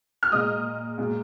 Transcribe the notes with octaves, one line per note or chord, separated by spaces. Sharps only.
F6
A#2 G#3 D#5 D#6
A#2 G#3